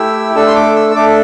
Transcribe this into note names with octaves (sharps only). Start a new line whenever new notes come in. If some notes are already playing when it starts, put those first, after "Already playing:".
Already playing: A3 E4 G4 E6
A3 D4 A4 E6
C6
D6
E6
E6
A3 D4 A4 D6